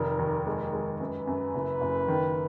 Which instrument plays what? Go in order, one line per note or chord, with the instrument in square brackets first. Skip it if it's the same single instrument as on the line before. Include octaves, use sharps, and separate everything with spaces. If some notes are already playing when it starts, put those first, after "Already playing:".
Already playing: [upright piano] F1 D#3 [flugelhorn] A#4
[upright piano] D#2
[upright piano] G#3 [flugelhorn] A#4
[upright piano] G#3
[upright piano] F#2 [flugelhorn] B4
[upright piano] F#2
F#1
F#1
D#3